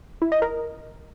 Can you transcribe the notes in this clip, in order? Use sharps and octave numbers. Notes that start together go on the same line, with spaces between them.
E4
D#5
A#4